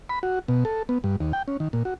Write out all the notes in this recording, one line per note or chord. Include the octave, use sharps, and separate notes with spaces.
B5
F#4
B2
A4
B3
G2
D#2
G5
C#4
D#3
A#2
F#4